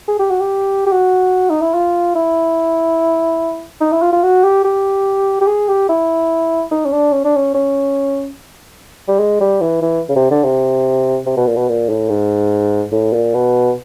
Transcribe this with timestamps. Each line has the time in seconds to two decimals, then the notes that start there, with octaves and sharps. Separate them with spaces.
0.08 G#4
0.19 G4
0.30 F#4
0.41 G4
0.86 G4
0.92 F#4
1.50 D#4
1.62 E4
1.74 F4
2.15 E4
3.81 D#4
3.92 E4
4.02 F4
4.13 F4
4.23 F#4
4.44 G4
4.65 G4
5.41 G4
5.47 G#4
5.68 G4
5.89 E4
6.71 D#4
6.85 C#4
6.92 D4
7.12 C#4
7.25 D4
7.36 C#4
7.55 C#4
9.08 G3
9.19 G#3
9.40 G3
9.61 E3
9.82 E3
10.09 C#3
10.16 C3
10.31 D3
10.44 C3
11.26 C3
11.37 B2
11.47 A#2
11.56 B2
11.68 A#2
11.89 A2
12.09 G#2
12.92 A2
13.13 A#2
13.34 B2